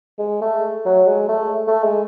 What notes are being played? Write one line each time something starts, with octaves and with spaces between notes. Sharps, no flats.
G#3
A3
F#3
G#3
A3
A3
G#3